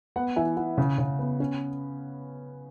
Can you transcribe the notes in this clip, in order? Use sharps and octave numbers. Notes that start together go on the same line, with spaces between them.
B3 F#5
E3 E5 G#5
E3 F#5
C#3
C#3
B3
C#4